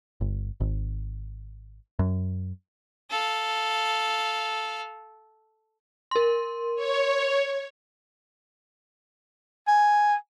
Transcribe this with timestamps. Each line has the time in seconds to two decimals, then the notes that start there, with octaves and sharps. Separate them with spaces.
0.21 G1
0.60 G#1
1.99 F#2
3.11 A4 F5
6.11 A#4 C6
6.75 C#5
9.68 G#5